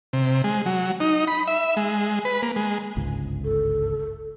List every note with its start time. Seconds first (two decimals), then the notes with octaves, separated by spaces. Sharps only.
0.13 C3
0.44 G#3
0.66 F#3
1.00 D#4
1.28 B5
1.48 E5
1.77 G#3
2.25 B4
2.43 A#3
2.56 G#3
2.96 G1 C#2 G#2
3.44 A4